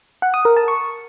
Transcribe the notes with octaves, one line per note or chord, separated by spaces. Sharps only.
F#5
D#6
A#4
A5
C#6